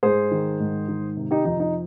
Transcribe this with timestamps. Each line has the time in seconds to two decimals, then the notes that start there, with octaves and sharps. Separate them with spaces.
0.03 G#2 G#4 C5
0.31 D#3
0.60 G#2
0.88 D#3
1.17 C3
1.31 D#4 G4
1.45 F2 D#4
1.60 D#4